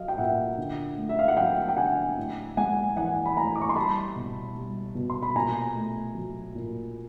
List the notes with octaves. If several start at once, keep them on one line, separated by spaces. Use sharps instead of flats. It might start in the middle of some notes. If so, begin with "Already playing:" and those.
Already playing: F#3 D#5 F5
G5
A#2 E5 F#5
D3
A3
E5
F5
F#5
F#3 F5 G5
G5
D3 F#5 G#5
A2
G#3 F#5 G#5
E3 F#5 G#5
B5
A2 G#5 A#5
D6
C#6
C6
G3 A5 B5
B2
G3
B2
C6
B5
A#2 G#5 A#5
A3
F#3
A#2